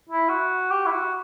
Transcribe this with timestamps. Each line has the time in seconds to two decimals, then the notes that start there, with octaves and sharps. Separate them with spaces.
0.09 E4
0.29 F#4
0.71 G4
0.86 E4
0.91 F#4